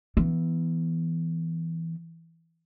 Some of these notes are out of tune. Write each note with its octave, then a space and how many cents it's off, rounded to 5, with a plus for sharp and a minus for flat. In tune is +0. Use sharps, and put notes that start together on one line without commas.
E3 +0 B3 +0